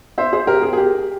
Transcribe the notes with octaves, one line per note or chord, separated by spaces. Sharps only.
C5 E5
G#4 C5
G4 A#4
G#4
G#4
G4